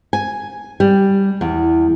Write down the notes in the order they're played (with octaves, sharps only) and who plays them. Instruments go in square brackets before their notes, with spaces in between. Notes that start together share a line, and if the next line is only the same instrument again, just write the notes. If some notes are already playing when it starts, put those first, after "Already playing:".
[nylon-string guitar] G#5
G3
E2